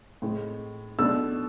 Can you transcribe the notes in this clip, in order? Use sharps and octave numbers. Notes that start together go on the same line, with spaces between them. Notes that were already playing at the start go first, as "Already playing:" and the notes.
A2 G#3 C4
B2 A3 D4 E6